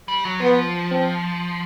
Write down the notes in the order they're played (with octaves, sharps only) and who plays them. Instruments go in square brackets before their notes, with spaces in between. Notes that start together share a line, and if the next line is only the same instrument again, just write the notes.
[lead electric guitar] G3
F#3
[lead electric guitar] F3 [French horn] B3
[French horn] C4